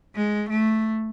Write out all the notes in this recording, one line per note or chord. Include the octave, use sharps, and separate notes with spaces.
G#3
A3